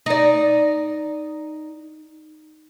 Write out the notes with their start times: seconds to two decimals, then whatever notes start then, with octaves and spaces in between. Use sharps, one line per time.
0.06 D#4 D5